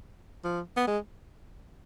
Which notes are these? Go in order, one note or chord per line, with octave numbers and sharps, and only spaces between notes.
F3
B3
G#3